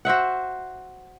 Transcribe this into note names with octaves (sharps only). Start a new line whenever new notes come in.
F#4 C5 E5 F#5